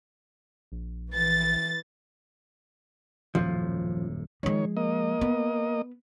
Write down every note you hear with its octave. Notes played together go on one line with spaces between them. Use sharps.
A#1
E3 A6
D#1 F#2 A2 F3
D#3 F3 G#3 C#5
A#3 D#5
B3